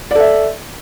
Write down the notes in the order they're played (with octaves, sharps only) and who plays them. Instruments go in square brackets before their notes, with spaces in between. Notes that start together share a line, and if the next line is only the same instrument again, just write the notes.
[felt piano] D5
A4
E5